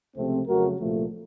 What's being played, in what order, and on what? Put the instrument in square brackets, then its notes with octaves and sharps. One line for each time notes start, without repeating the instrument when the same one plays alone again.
[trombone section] C#2 C3 F3 A3 C4
F2 C#3 F#3 A3 F#4 A#4
C2 A#2 F3 A3